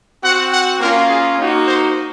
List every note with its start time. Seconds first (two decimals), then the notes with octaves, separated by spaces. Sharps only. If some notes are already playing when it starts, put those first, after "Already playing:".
0.23 C4 F#4 F#5
0.52 F#5
0.80 A#3 C#4 F4 A#4
1.09 G#4
1.37 A#3 D#4 F#4
1.65 C5